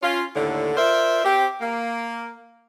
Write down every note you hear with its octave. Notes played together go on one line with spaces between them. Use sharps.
C#4 F4
D#2 A2 D3
F4 A#4 C5 D5 E5
C4 G4
A#3